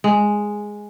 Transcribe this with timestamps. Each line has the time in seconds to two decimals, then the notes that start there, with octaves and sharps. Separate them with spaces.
0.04 G#3